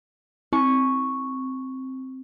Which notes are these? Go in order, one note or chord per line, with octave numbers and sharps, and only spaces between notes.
C4 C#6